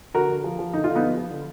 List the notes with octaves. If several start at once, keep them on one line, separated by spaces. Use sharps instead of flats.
D3 F#4 A#4
D3
F3
F3
D3 D#4
D3 F4
B3 D#4
F3
F3
D3